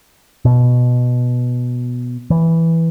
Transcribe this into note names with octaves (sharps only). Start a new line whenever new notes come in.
B2
E3